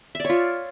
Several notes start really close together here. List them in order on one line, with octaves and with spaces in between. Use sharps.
E5 D5 C#5 F4